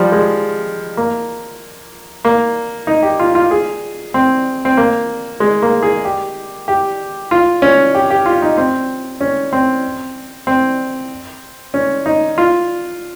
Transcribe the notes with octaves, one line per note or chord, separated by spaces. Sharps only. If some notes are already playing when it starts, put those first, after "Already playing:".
Already playing: F3 G3
G#3
A#3
A#3
D#4
G4
F4
F4
G#4
C4
C4
A#3
G#3
A#3
G#4
G4
G4
F4
C#4
G4
G4
F4
D#4
C4
C#4
C4
C4
C#4
D#4
F4